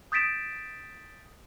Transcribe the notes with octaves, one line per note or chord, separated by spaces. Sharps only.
D#6 G6 A6 B6 D7 E7